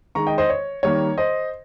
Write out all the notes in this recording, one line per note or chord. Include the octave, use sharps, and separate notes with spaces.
D#3 G#3 A#5 C#6
D#5 G5
C5 D#5
C#5
D#3 G3 A#3 C#5
C5 D#5